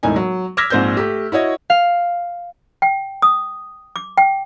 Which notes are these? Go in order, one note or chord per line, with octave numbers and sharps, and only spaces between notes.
E1 A2 D#4 G#5
F#3
D6 E6 F6 G#6 A#6 B6
A#1 G#2 C4 C5 D5 G6
A3 G4
E4 F#4 C#5 D#5
F5
G5
D#6
D6
G5